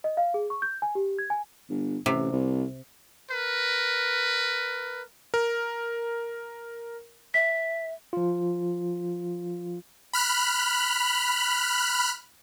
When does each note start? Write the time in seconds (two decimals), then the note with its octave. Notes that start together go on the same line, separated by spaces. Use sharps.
0.04 D#5
0.17 F5
0.34 G#4
0.50 C#6
0.62 G6
0.82 G#5
0.95 G4
1.19 G#6
1.30 G#5
1.70 G1
2.06 A1 C3
2.32 C2
3.31 A#4 B4
5.34 A#4
7.34 E5 B6
8.13 F3 F4
10.13 B5 F6 F#6